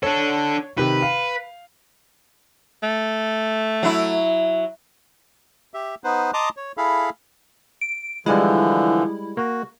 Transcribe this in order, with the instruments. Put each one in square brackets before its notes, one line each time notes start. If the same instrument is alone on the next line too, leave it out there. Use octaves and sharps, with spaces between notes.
[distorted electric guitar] D4 A4 [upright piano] C#5
[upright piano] C3 D#3 [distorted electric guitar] B4
[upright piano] F5
[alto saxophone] A3
[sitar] F#3 E4
[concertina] G4 E5
B3 D#4 B4 C5
D#5 A5 A#5 C6 D6 D#6
C#5
E4 G#4 A4 F5 B5
[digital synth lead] D7
[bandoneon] D3 E3 F3 [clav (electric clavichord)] G3 G#3 [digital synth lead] E4
[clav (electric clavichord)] A#3 [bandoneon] F#4